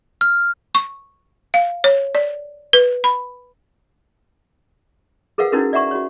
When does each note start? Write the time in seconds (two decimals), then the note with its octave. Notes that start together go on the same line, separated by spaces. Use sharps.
0.21 F6
0.75 C#6
1.54 F5
1.84 C#5
2.15 D5
2.73 B4
3.04 B5
5.38 G#4 A#4 B4 F5 F#5
5.52 C#4 D#4 E4 F#4 A#4 B4
5.73 D5 E5 F#5 A#5 C#6
5.91 F#4 C#5